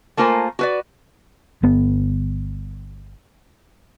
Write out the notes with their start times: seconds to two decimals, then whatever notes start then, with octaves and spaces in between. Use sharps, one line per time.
0.17 A3 A#3 F4 A#4 C5 G#5
0.59 F#4 B4 D5
1.63 G1 B3